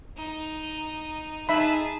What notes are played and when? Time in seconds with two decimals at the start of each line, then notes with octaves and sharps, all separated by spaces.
0.18 D#4
1.49 D#4 G#4 E5 A5 B5